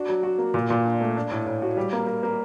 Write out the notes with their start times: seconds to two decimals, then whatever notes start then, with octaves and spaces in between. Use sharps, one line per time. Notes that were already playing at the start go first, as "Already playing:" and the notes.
Already playing: D4 F#4
0.09 F#3
0.23 F#4
0.38 A#3
0.54 A#2
0.70 A#2
0.85 D4
1.01 A3
1.16 D4
1.31 A2
1.47 A2
1.62 F#4
1.77 G3
1.93 A#3
2.07 A#3
2.23 A#3